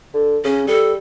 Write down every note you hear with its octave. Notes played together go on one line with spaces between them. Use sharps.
D3
C#3 C#4
G3 A4